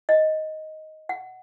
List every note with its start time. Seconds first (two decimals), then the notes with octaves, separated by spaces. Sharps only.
0.09 D#5
1.09 F#5